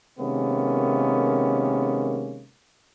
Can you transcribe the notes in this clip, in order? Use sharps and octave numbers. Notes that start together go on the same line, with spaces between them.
C3 D#3 G#3 A#3 B3 C#4